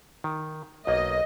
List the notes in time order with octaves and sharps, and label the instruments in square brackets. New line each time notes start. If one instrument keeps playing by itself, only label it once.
[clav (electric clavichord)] D#3
[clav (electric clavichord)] B1 A#3 [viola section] D#5